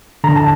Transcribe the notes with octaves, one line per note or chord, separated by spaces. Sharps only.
D3 A#5
A5